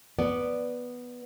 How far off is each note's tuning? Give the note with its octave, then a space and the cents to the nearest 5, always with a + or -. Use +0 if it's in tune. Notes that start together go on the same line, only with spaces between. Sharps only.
B3 -5 D5 -5